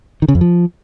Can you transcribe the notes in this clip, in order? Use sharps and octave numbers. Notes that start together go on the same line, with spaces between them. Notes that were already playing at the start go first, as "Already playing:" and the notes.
D#3
C#3
F2
F3